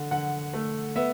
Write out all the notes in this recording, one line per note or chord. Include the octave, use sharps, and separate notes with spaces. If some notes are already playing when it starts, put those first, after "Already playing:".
Already playing: D3
D3 F#5
A3
B3 E5